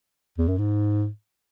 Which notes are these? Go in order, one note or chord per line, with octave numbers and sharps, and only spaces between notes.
E2
F#2
G#2